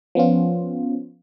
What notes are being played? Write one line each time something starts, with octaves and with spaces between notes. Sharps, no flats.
F3 B3 C#4 F4